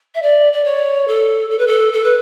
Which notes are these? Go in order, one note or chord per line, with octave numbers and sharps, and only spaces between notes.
E5
D5
D5
C#5
A4
A4
B4
A4
A4
B4